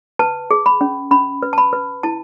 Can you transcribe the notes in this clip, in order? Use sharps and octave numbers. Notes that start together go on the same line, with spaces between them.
B4 A5
G#4
B5
C#4
C#4 B5
B4
A5
B5
B4
E4 A5